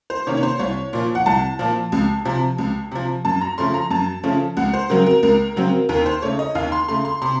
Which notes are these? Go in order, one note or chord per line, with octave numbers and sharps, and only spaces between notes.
C5
C3 D#3 A#3 C#4 C#5
C#5
C5
C2 C#5
A#2 F3
F#5
C2 A5
A#2 F3
C#2
C3 F3
C#2
C3 F3
F#2 A5
A#5
C#3 F3 A3 C#4 C6
A#5
F#2 A5
C#3 F3 A3 C#4
C#2 F#5
C5
C#3 F#3 C4 A#4
A#4
C#2 A#4
C#3 F#3 C4
D#2 A#4
C5
C#3 A3 C#5
D#5
D#2 F5
C6
C#3 A3 C6
C6
C3 C6